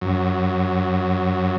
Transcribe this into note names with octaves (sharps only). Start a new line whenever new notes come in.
F#2